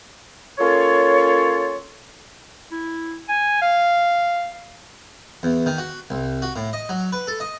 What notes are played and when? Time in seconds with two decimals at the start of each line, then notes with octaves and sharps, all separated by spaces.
0.59 A#3 C#4 F4 A4 C#5
2.71 E4
3.29 G#5
3.61 F5
5.43 E2
5.66 D#3
5.78 F#4
6.10 C2
6.42 F#4
6.56 A2
6.73 D#5
6.89 F#3
7.12 B4
7.27 A4
7.40 D#5